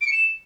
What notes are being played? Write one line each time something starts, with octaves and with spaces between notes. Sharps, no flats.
D7
C#7
E7